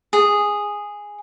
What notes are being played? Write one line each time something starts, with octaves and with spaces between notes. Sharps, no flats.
G#4